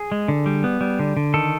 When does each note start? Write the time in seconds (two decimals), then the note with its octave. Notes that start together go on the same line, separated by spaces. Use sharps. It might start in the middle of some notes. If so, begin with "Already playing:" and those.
Already playing: G#4
0.12 G#3
0.28 D3
0.46 G3
0.64 B3
0.81 G3
0.99 D3
1.17 D3
1.34 D#3 A4